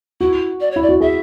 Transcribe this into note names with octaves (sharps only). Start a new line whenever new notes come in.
E4 F#4
D5
C#5
E4
D5
F#4
G#4 E5